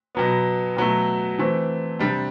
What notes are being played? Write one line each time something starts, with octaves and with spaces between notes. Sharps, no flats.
B2 F#3 B3
B2 F#3 A3
E3 A3 C4
C3 G3 D4